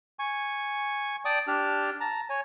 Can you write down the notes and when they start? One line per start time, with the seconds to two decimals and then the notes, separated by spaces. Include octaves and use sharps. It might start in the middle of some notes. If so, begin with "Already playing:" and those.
0.19 G#5 C#6
1.25 D5 G5 A5 D6 D#6
1.47 D4 G4 A5 F6
2.01 A5 A#5
2.30 C#5 G#5